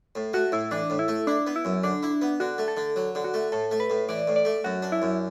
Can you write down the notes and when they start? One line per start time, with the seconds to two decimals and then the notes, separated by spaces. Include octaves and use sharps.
0.15 A2
0.33 A3 F#4
0.52 A2 E4
0.71 E3 D4
0.90 A2
0.99 E4
1.08 A3
1.27 D4 E4
1.47 B3
1.56 E4
1.65 F#2
1.84 D3 D4
2.03 E4
2.22 B3
2.40 D3 F#4
2.58 A3
2.68 A4
2.77 D3
2.96 F#3
3.15 D3
3.24 F#4
3.34 A3
3.52 A2 A4
3.71 A3
3.80 B4
3.90 A2
4.09 E3 D5
4.28 A2
4.36 D5
4.45 A3
4.64 F#2 F#4
4.82 D4
4.92 E4
5.02 F#2